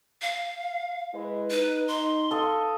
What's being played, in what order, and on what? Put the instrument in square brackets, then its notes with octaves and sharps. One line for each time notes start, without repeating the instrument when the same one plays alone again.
[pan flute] F5
[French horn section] G#3 E4 B4
[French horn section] D#4 [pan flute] B4
[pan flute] C6
[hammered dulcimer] A4 D#5 F5